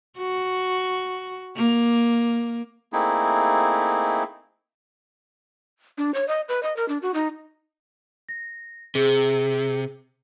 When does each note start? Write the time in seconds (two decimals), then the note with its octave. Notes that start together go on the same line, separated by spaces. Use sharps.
0.18 F#4
1.56 A#3
2.93 A3 A#3 C4 D#4 E4 G#4
5.98 D4
6.14 C#5
6.28 D#5
6.49 B4
6.63 D#5
6.77 A#4
6.88 D4
7.02 F#4
7.14 D#4
8.29 A#6
8.95 C3 G#4